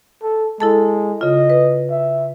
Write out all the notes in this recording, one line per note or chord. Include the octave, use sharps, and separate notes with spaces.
A4
G#3 E4 A4 A5
C#3 F4 D#5
B4
E5